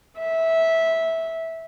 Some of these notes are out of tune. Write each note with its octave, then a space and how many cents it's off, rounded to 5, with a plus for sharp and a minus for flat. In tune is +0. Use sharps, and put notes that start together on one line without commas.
E5 -15